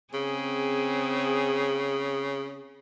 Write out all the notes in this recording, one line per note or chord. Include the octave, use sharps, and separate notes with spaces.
C#3 C4 G#4